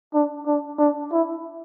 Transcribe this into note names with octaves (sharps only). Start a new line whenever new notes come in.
D4
D4
D4
E4